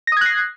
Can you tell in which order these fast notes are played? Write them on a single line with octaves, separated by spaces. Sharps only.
A#6 D#6 G#6 F#6 C7